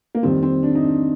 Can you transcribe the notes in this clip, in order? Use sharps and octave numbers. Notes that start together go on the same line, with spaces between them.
A#3
F2 D#3 G3 C4
C4
D4
D#4
D4